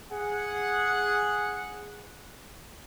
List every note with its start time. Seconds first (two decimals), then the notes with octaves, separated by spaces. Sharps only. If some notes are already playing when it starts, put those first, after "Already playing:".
0.12 G#4 F#5